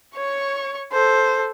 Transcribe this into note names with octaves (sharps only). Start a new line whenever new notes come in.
C#5 C#6
A4 C5